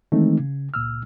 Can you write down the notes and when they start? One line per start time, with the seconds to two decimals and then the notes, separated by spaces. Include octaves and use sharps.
0.12 D#3 E3 G#3 A3 C4 D#4
0.39 C#3
0.74 C#2 A#2 E6 F6